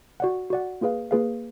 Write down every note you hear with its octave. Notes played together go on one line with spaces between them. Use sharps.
F#4 D5 F#5
F#4 D5 F#5
A#3 F4 G#4 B4 F5
A#3 F4 G#4 B4 F5